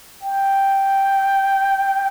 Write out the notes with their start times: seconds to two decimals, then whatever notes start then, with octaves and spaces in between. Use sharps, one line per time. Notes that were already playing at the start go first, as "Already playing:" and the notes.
0.22 G5